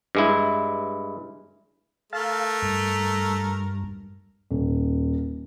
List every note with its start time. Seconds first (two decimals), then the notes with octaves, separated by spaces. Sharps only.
0.15 G2 G#3 E4
2.13 A3 A#4 F5 A5
2.62 G2
4.51 D#1